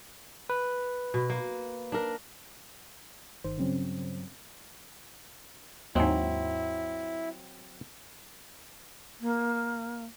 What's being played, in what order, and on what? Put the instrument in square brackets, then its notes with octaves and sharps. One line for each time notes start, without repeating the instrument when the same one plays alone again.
[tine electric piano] B4
[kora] B2
A#3
D4 A#4
[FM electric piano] G1 D#3 C5
[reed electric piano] G2 F#3 [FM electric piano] C#3 C4 C#4
[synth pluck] D#2 G#2 [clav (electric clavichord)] F#3 C4 [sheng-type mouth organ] E4
[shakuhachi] A#3